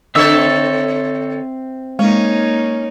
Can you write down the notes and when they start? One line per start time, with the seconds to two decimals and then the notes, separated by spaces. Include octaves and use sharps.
0.15 D3 C4 A4 C#5 E5 E6
1.99 G#3 A#3 C#4 D#4